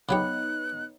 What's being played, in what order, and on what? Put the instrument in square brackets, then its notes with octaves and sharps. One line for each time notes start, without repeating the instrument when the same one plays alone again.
[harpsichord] C#3 F#3 G4 [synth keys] B3 D#4 [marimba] C#5 B5 [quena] F#6